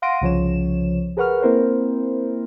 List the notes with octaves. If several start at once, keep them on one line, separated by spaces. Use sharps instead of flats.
F5 F#5 C6 A#6 D7 D#7
C2 C#3 F3 C#5 E7
G#4 A#4 B4 F#5 C#6 F6
A#3 C4 E4 A#4 C5